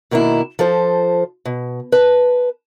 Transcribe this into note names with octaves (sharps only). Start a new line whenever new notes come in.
B2 D#3 A#3 D4 E4
F3 A4 C5
B2
B4 A5